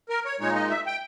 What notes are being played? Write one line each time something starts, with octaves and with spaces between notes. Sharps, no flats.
A#4
C#5
A#2 G#3 D#4 C#5
D#5
E5
G5